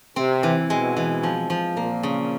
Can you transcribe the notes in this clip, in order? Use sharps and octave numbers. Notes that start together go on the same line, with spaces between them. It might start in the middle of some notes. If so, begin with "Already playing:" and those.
C3 C4
E3
B2 G#3
E3
F3
F3
A#2 A#3
C#3